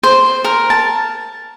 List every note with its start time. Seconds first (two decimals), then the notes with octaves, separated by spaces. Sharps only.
0.03 C5
0.44 A#4
0.70 A5